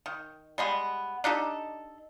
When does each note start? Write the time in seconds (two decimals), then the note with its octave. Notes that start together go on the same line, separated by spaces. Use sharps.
0.06 D#3
0.58 G3 G#3 B3
1.24 D4 D#4 G4 A4